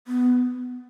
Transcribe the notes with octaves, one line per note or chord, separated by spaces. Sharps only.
B3